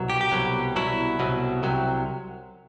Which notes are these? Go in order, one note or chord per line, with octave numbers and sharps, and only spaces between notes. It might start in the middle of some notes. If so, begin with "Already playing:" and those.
Already playing: C2 B2 F#3
G4
G4
C2 B2 F#3
C2 B2 F#3 E4
C2 B2 F#3
C2 C3 F#3